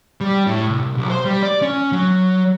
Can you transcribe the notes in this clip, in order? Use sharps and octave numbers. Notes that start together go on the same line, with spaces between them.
G3
A2
C2
B1
C5
G3
D5
C#4
F#3